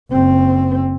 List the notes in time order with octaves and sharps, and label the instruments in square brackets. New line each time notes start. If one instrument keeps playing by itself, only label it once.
[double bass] F#1 C4